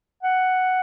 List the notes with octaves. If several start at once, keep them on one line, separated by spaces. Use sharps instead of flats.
F#5